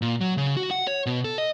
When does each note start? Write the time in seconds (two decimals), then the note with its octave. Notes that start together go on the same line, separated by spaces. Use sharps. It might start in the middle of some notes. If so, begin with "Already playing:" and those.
0.02 A#2
0.21 F#3
0.37 C#3
0.57 F#4
0.71 F#5
0.87 C#5
1.06 B2
1.24 A4
1.38 D#5